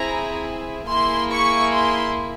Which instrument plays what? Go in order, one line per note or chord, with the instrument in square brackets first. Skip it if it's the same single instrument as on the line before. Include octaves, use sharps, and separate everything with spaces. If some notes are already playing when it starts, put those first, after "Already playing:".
Already playing: [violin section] C4 E4 G#4 A#5
A#3 E4 G#4 C6
C#6
C6